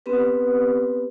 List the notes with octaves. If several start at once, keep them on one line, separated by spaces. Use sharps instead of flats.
B3 C4 G4 B4